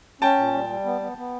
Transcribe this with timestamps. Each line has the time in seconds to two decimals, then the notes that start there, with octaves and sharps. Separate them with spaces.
0.21 C#4 G5 A5
0.38 A#2
0.54 G3
0.69 G3
0.85 B3
1.02 B3
1.18 B3